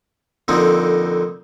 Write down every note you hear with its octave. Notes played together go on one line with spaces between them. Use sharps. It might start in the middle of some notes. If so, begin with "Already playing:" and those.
F2 D3 A#3 C4 D#4